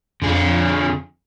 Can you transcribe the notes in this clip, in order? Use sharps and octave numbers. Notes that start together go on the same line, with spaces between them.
F2 D3 G#4